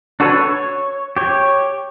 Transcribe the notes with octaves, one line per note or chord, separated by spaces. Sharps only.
D4 F#4 A4 B4 C#5
C#5
G4 C#5